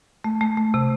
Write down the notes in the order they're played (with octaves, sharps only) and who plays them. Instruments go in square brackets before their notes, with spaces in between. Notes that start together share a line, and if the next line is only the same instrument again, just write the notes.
[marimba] A3
A3
A3
C3